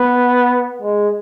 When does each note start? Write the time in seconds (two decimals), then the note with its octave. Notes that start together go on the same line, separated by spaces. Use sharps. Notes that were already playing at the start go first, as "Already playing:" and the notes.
Already playing: B3
0.82 G#3